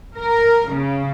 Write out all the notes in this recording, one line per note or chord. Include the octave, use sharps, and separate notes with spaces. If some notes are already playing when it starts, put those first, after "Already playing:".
A#4
C#3